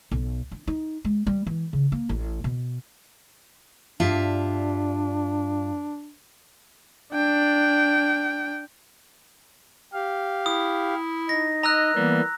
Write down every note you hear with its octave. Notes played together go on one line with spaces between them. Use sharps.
B1
D4
D#4
G#3
G3
E3
C#3
A#3
A1
B2
G2 D4 F4 E5
D4 G5
G4 F5
E4 D#6
D#4 A#6
D#5 A#5 E6 F#6
E3 G3 A#3 B3